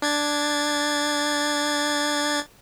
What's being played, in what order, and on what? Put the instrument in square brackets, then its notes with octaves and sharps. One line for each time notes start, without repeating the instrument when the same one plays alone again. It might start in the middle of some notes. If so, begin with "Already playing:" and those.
[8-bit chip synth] D4 G#6 A6